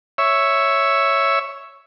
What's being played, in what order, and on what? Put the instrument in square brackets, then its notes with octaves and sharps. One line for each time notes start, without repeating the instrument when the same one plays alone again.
[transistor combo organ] C#5 E5